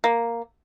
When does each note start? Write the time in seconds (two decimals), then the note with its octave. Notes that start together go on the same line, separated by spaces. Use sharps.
0.04 A#3